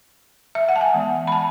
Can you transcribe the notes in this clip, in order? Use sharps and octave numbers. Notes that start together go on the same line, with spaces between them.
E5
F#5
A5
G#5
E3 G#3 B3
B5
A5